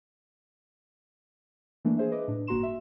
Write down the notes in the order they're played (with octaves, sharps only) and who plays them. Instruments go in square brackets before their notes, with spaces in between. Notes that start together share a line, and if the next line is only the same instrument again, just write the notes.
[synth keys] E3 A3 A#3 D4
G#4 C5 E5
B4 D#5 D6
A2 D4
G1 A#3 F#4 A#5 C6 E7
E5